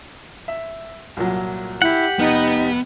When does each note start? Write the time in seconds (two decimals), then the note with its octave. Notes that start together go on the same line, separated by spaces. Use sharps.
0.48 E5
1.17 C2 A#2 F#3
1.82 E4 G4 F#5
2.19 F1 B3 D#4